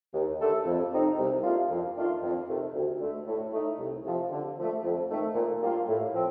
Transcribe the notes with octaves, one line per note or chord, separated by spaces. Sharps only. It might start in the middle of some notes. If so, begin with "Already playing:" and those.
D#2
D3 A3 D4 A4
F2
C3 G3 C4 D#4
C2
A#2 A3 D4 F4
F2
D#3 A3 D4 F4
F2
C3 D#3 A3
D2
D3 A3
A2
A3 D#4
C2
C3 F3
D3
F3 A3
F2
D#3 A3
A#2
G3 A#3 D4 F4
A2
F3 C4